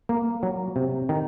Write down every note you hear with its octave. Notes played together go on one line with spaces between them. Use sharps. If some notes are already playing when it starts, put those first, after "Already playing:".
A#3
F#3
C3
D#3